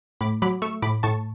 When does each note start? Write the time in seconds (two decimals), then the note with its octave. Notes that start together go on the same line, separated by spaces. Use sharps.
0.21 A2 B5 D6
0.42 F#3 B5 D6
0.62 A3 C#6 E6
0.82 A2 B5 D6
1.03 A2 A5 C#6